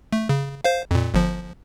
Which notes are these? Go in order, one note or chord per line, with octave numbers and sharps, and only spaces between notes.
A3
C#3
C5 F5
F2 A#2
G1 F3